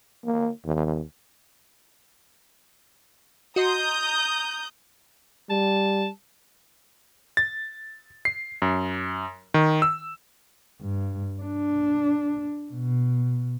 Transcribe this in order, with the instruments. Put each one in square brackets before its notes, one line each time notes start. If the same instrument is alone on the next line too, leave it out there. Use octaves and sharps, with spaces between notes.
[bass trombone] A#3
D#2
[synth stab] F#4 D#5 C6 [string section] A#5 D#6 G6
[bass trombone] G3 [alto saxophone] A5
[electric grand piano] A6
C7
F#2
D#3
E6
[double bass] G2
D4
B2